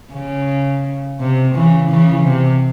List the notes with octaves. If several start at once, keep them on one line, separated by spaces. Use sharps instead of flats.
C#3
C3
C#3 E3
C#3 E3
C3